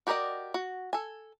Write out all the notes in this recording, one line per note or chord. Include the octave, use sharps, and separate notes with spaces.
F#4 G4 A#4 D5 D#5
F#4
A4 G#5